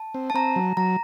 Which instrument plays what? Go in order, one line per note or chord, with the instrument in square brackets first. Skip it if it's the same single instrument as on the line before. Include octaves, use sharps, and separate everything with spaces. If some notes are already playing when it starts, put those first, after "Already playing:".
Already playing: [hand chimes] A5
[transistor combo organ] C4
[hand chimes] A5
[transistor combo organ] C4 [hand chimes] A#5
[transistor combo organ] F#3
[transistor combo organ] F#3 [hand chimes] A#5